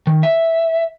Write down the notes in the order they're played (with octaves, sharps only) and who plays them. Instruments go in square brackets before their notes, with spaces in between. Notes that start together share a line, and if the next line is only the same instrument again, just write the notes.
[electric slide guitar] D#3
E5